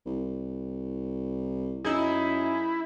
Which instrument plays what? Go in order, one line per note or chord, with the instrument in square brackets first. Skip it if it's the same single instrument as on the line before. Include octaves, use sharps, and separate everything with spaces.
[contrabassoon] C2
[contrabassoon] F#2 [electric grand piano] D#4 G#4 [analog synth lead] E4